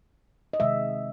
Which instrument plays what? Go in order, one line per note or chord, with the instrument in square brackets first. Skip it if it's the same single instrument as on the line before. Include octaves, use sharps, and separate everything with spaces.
[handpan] D#5
C3 D#3 G#3 E5